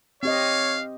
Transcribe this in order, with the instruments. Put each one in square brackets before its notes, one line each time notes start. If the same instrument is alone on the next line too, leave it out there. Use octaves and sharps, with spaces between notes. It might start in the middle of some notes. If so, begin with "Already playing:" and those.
[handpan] C4 G4 D#5 [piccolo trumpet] C#5 [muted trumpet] F5